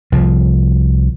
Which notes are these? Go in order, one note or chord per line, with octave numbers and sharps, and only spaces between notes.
C2 F3